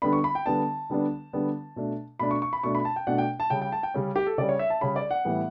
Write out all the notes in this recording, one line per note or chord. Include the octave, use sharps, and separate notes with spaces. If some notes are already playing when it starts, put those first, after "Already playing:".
D3 G3 B3 D4 B5
C#6
B5
G5
D3 G3 B3 D4 A5
D3 G3 B3 D4
D3 G3 B3 D4
B2 A3 D4
B2 A3 D4 B5
C#6
C#6
B5
B2 A3 D4 C#6
B5
A5
G5
B2 A3 D4 F#5
G5
A5
C#3 G3 C#4 G5
G5
A5
G5
C#3 G3 C#4
G4
A4
C#3 G3 C#4 D5
C#5
E5
A5
C#3 G3 C#4 B5
D5
F#5
A2 E3 G3 B3